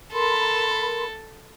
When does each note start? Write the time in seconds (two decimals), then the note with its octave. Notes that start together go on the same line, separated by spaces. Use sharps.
0.13 A4 A#4 B5 C6